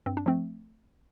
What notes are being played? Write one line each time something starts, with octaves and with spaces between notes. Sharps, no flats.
G2 C4
D4
F3 A3 C4